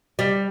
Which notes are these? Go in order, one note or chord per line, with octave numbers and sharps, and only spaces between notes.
G3